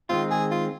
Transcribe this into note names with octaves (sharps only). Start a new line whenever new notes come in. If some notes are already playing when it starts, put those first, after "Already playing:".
D#3 G#3 C4 F4
G#4
F4